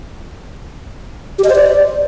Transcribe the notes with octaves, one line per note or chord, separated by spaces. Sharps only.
G4
D#5
C5
D5